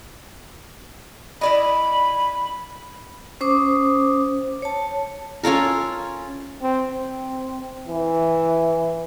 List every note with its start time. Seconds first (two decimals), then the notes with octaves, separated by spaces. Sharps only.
1.41 E4 D5 D#5 B5
3.41 C#4 C5 D6 D#6
4.62 C#5 A5
5.43 C#4 F4 A4 A#4
6.62 C4
6.92 C4
7.88 E3